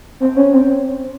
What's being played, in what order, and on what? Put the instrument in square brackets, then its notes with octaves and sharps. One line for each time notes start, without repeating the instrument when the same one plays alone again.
[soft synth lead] C4
C#4
C4